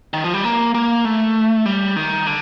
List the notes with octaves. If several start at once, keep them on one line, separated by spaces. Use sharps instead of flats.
D#3
F3
G3
A#3
A#3
A3
G3
D#3
D3